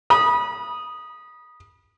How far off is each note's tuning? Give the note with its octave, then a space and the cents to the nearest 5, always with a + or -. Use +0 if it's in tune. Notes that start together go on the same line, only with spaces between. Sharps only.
B5 -30 D#6 -5